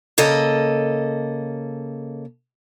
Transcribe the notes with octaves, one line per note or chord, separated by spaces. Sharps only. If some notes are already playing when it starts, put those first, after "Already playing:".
C#3 A#3 A4 D#5